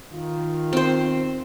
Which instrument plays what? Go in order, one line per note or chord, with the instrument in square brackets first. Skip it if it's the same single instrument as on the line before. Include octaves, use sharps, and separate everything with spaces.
[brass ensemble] D#3 F4
[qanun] C4 C5